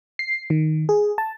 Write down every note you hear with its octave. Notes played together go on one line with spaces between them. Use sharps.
C7
D#3
G#4
A5